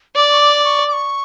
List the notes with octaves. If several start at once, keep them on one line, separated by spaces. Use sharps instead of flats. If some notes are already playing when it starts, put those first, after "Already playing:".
D5 D6
C#6
D6
C#6
D6
C#6